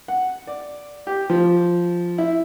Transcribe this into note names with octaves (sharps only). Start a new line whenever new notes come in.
F#5
D5
G4
F3
E4